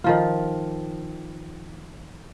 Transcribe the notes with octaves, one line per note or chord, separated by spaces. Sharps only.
D#3 F3 F4